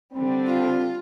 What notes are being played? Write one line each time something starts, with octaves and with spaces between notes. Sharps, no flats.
D3 G3 C4
F4